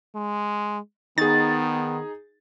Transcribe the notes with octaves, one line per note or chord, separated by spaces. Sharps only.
G#3
D#3 B3 D#4 G#4 A6